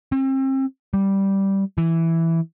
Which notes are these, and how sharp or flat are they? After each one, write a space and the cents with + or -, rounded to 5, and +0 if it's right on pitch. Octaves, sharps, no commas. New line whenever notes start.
C4 +35
G3 -5
E3 +0